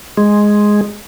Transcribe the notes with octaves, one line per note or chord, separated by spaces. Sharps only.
G#3